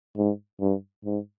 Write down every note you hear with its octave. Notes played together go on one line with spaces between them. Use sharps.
G#2
G2
G#2